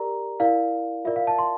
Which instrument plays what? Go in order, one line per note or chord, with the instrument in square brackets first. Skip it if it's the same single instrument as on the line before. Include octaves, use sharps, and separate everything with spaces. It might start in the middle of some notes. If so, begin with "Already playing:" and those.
Already playing: [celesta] G4 A#4 D5 A#5
E4 A#4 D5 F5
F4 A#4 D5 E5
F5
A5
C6